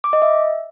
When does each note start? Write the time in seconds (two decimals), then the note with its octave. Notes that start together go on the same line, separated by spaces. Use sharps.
0.04 D6
0.13 D#5
0.22 E5